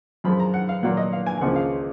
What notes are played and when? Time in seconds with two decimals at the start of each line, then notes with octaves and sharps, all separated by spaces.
0.24 F#2 F3 G#3 B5
0.40 A#5
0.54 F#5
0.69 F5
0.83 A#2 F#3 A#3 F#5
0.97 D#5
1.13 F5
1.26 G#5
1.38 G#5
1.41 C#2 C#3 F3 A#3 F#5
1.56 F5